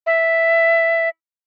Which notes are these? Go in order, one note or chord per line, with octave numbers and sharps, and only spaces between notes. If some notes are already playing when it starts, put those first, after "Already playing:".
E5